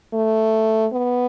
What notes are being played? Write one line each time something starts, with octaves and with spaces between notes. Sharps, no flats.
A3
B3